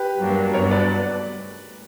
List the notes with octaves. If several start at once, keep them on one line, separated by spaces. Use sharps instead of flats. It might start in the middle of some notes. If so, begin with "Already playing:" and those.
Already playing: G4 B4
G2 F#3 A#3 D4
G2 F#3 B3 D4 A#4 C#5
B4 D5